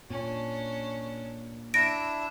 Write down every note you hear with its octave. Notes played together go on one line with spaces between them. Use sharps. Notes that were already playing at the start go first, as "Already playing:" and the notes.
A#2 C#4 D4
D4 E4 E5 A#6 D7